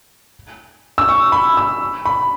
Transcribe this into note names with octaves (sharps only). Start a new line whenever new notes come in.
E6
C#6
B5
E6
B5